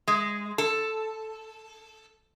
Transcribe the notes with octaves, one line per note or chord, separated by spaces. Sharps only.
G#3
A4